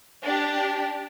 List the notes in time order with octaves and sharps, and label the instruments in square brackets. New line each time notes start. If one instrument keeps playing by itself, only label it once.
[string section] D4 G4